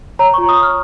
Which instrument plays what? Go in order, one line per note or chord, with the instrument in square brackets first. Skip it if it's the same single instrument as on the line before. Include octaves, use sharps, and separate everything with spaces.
[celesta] C#5 A#5
F4 C#6
D#6
C#5
F6